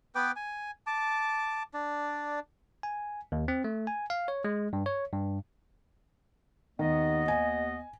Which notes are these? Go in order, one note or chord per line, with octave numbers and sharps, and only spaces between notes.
B3 B4 G5 D6
G#5
A5 D6
D4 D5
G#5
D#2
C4
A3
G#5
F5
C#5
G#3
G2
C#5
G2
D#2 D#3 B3 D#5
G#5